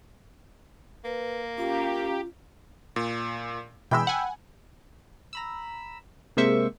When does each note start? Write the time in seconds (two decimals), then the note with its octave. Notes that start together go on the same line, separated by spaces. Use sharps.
1.05 A#3 B4
1.58 C#4 F4 G4 F5 A#5
2.96 A#2
3.91 B2 E3 G#3 G5 B5 E6
4.07 F#5 G#5
5.33 A#5 B5 E6
6.37 C3 G#3 A#3 C5 E5 C#6